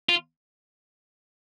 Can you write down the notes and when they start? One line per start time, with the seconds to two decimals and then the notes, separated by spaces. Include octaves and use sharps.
0.09 F4